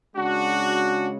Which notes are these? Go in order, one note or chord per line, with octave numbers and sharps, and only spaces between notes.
C#3 G#3 D4 F#4